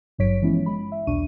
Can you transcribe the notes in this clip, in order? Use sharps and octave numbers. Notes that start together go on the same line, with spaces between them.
G#1 G2 F#3 C#5 B6 D7
E3 F3 G#3 B3 C#4 E4
G#3 B5
E5
B1 E2 B2 D4 C#6 D#7